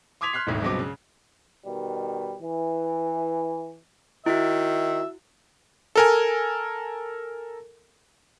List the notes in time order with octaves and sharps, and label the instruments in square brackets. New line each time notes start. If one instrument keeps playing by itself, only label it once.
[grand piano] C6 D6 D#6 G#6 B6 F7
C6 F6 F#6 B6 C7
D#1 G#1 D2 D#3
C#2 G2 B2 F#3 C4 D6
C#3
[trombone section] B2 D#3 G3
E3
[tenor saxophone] D#3 [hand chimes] E4 F#4 [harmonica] E5
[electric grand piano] A4 A#4 G#5